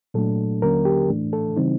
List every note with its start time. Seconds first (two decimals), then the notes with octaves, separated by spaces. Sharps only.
0.14 A#2 F#3 A3 D4 A4
0.62 D#2 D3 F#3 A#3 C#4 A#4
0.85 G4
1.09 A2 E3 A3 D4
1.33 A4
1.56 C#3 E3 G3 C4 D#4